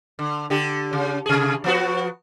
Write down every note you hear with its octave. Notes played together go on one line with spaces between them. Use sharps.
D3
D3 G4
C#3
C3 G#4
F3 B3 F#4